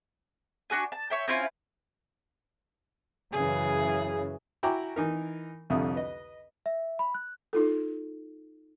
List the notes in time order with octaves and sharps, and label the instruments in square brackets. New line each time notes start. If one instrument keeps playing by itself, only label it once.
[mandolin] D4 F#4 G#4 G#5
A5
C#5 E5 G5
C4 C#4 E4 F4
[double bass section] F#2 C#3 E3 [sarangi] G#4
[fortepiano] E4 F#4 G5 G#5 A#5 D6
E3 D#4 A#4
C2 F2 D3 E5 D#6
B4 D#5
[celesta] E5
B5
F#6
[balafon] D#4 F4 A4